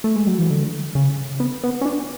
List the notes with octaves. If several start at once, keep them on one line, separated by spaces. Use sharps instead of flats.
A3
G#3
F#3
E3
D3
C#3
B3
B3
C#4
D4